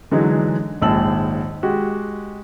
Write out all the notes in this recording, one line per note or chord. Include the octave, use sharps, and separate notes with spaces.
D3 E3 F#3 G#3 D#4
A#1 D#2 G#2 A5 E6 F#7
G#3 F#4 G4